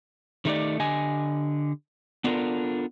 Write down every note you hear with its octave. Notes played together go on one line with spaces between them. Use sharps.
D#3 G3 A3 D#4 G4 D5
D3 G4 D#5 G#5
B3 D4 F4 G4 A4 A#4